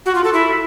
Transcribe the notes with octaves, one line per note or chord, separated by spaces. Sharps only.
F#4
F4
A4
E4